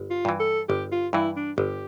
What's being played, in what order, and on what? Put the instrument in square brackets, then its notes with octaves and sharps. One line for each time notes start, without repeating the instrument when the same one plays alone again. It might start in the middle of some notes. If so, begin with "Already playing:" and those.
Already playing: [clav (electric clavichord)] G1
[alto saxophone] F4
[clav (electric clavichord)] G2 E3
[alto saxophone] A4
[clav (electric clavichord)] G1 [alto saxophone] G4
[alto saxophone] F4
[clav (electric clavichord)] G2 E3 [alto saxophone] E4
[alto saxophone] D4
[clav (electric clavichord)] G1 [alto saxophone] G4